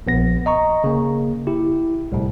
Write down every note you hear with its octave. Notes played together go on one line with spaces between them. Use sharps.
A#1 B3 A#6
D#5 A#5 C#6
C#3 A#3
E4 G4
C2 A2